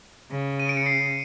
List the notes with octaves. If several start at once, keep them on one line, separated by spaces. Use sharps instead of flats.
C#3
D#7
D7
C#7
C7